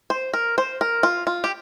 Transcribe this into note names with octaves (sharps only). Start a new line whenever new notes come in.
C5
A#4
C5
A#4
F4
F4
G4